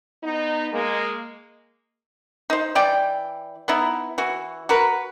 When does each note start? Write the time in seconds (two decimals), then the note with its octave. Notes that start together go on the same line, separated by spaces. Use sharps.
0.24 B3 D#4
0.72 G#3 A#3
2.50 D#4 C5
2.75 E3 D5 G5
3.68 B3 D#4 E4
4.18 E3 F#4
4.69 F#4 A#4 B4